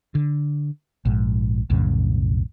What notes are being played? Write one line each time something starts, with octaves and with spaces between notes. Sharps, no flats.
D3
A#1 G#2
B1 F2 A2 C#3